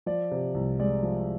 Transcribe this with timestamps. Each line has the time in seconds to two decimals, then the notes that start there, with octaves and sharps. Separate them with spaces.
0.06 F3 D5
0.31 C3
0.54 C2
0.79 G#3 D5
1.03 F3